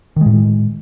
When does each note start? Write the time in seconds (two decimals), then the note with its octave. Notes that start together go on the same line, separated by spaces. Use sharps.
0.16 D#3
0.21 G#3
0.26 A2